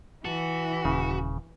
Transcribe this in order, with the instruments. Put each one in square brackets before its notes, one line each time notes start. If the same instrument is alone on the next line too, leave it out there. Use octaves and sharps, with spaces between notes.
[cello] E3 [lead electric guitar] F#4 [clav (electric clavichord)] A5
[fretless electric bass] D#1 [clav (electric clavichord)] C#3